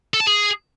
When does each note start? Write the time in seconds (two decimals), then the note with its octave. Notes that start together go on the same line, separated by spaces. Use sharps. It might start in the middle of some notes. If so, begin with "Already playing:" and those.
0.14 A4
0.20 A5
0.27 G#4